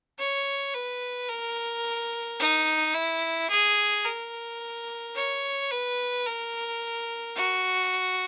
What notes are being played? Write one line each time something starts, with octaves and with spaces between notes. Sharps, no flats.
C#5
B4
A#4
D#4
E4
G#4
A#4
C#5
B4
A#4
F#4